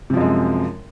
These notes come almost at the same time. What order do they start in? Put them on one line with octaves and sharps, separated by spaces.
C3 F3 F#2 G#3